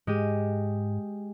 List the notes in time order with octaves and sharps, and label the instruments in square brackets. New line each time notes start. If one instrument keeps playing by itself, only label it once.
[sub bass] G#2 [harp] G#3 G4 D#7